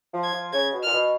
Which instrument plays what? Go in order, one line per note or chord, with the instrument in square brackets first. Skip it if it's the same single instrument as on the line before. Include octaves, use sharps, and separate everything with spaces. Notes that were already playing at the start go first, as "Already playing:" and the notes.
[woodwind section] F3
[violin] G#6
[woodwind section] F3
[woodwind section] C#3 [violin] G#6
[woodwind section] B2
[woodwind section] A#2 [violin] F6
[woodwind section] B2